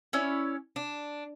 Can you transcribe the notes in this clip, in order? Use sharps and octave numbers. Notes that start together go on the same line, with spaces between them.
C#4 E4 C#5 D5
D4